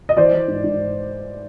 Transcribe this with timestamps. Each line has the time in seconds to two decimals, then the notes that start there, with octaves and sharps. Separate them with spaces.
0.09 D#5
0.17 E3 C5 D5
0.32 E3
0.48 G#2
0.64 G#2